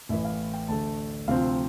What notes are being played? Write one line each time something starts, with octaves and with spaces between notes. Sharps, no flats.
A1 A2 E3 E5
F5
G5
D2 D3 A3 A5
D2 C3 F3 C4 F5